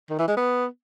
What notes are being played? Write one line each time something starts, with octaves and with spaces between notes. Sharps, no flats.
D#3
E3
G#3
B3